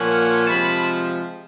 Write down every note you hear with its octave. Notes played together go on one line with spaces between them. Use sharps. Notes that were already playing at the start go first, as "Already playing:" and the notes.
Already playing: A#2 F3 A#3 C#4 F#5 G#5
C3 F3 G#3 A5 B5